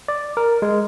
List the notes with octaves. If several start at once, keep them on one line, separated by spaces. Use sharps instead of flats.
D5
A#4
G#3